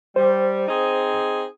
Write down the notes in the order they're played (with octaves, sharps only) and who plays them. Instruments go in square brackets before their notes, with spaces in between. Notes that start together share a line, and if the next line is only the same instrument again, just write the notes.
[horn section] G3 [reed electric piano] C5
[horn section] C4 D#4 G#4